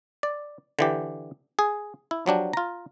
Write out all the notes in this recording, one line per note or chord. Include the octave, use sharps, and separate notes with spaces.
D5
D3 E3 G4
G#4
E4
F3 F#3 D4 G4
F4 A#5